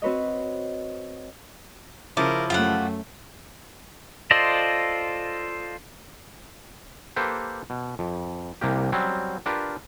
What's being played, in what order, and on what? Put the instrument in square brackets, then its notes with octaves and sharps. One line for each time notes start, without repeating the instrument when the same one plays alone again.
[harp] C4 F#4 B4 C#5 D#5
[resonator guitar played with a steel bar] C#3 F3 E4 [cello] A#4 [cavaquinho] D6
[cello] F#2 A3 [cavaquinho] F4 G4 F#5
[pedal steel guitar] F4 A4 C5 D5 D#5
[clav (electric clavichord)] A#3 G4 A4 B4 C5
B2
F2
C2 C3 A#3 G4
F#3 G3 C4 C#4
D4 F4 G4 A#4 B4